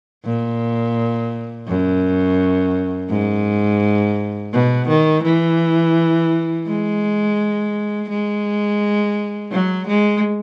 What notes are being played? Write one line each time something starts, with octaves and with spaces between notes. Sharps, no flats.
A#2
F#2
G#2
B2
D#3
E3
G#3
G#3
F#3
G#3